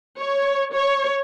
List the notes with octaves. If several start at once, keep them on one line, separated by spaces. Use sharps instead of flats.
C#5
C#5